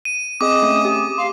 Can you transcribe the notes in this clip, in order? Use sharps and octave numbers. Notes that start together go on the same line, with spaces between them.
D#7
C4 G#4 D#5 D6 D#6
A3 C#4
G4
F5 C6